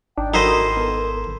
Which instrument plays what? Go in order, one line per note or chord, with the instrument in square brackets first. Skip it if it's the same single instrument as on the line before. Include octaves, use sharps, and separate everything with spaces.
[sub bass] G#1 [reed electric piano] D4 D#4 [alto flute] G5
[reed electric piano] D#4 F#4 A4 [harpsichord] E4 C5 D#5 [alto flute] A#4
[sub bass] G#1
[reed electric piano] B3 A4